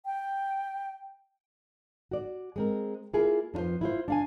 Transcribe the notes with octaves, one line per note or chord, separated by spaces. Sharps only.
G5
F#4 D5
G#3 C4 A#4
A#3 E4 F4 G#4
F2 D4 F4 B4 C5
E4 F4 C5
D4 F5 G#5